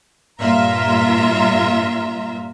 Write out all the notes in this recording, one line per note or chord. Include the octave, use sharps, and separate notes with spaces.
G2 A#2 F4 E5 A#5